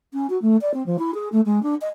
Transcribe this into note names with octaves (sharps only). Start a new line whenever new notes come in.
C#4
F#4
A3
D5
C4
F3
E4
G#4
A3
G#3
D4
D#5